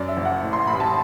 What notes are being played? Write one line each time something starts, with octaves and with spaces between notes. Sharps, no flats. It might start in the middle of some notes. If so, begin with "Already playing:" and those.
Already playing: F#2 D5
E5
F#1
F#5
A2
C6
A1 B5
A5